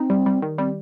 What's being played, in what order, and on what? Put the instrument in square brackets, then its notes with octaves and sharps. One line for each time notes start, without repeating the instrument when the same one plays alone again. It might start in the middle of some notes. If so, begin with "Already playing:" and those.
Already playing: [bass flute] C4 [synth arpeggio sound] D#4
[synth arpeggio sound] G3
G3
D#3
[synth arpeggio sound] G3 [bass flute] C4